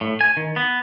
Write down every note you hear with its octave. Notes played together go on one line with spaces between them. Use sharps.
A2
G#5
D#3
B3